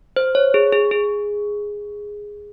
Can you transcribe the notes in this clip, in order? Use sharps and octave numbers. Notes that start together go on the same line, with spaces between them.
C5
C#5
G#4
G#4
G#4